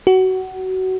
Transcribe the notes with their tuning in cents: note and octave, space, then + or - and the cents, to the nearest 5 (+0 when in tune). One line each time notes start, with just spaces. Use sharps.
F#4 +20